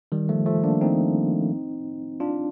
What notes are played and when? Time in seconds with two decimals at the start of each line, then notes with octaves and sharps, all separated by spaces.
0.12 D#3 G3
0.29 F3 A3
0.46 F3 A3
0.64 A#3 D4
0.81 C4 D#4
2.20 D4 F4